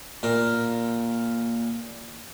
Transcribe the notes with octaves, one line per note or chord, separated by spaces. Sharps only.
A#2 A#4